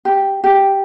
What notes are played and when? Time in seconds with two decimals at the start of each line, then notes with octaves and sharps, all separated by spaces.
0.05 G4
0.44 G4